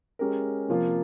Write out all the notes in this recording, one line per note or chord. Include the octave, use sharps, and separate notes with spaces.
G#3 C#4 G4 A#4
C3 F3 A#3 F4